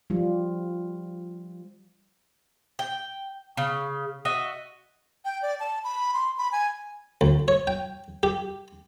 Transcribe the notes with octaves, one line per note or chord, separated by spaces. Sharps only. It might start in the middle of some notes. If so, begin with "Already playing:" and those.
F3 G3 F4
G5
C#3
F#4 D#5 E5
G5
D5
A5
B5
C6
B5
G#5
D2
C#5
G5
G4